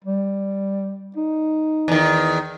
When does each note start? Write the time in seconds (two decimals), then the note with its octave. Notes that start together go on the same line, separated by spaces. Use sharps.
0.04 G3
1.16 D#4
1.88 E2 D#3